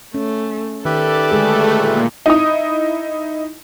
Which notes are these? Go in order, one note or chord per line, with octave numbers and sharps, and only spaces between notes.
A3 C#4
D#3 G4 A4 B4 D5 E5
D3 G#3 A3 G#4
A#2
D#4 E4 D#6